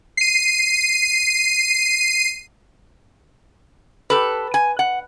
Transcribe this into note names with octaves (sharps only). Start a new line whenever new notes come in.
C7 D#7
G4 A4 B4
G#5
F#5